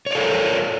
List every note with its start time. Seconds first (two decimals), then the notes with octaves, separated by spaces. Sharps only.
0.06 C#5
0.11 D5
0.15 A4
0.19 A#4